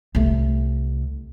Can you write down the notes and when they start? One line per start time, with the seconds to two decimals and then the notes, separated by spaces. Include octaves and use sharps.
0.15 C2 A3